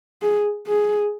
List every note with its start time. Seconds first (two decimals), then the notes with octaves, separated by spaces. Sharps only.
0.22 G#4
0.67 G#4